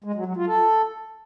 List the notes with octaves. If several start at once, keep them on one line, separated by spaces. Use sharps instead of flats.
G#3
F#3
F#3
F4
A4